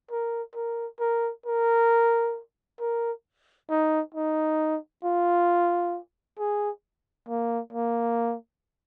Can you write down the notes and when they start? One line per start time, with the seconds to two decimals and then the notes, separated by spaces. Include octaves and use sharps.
0.11 A#4
0.55 A#4
1.00 A#4
1.46 A#4
2.80 A#4
3.70 D#4
4.14 D#4
5.04 F4
6.39 G#4
7.29 A#3
7.73 A#3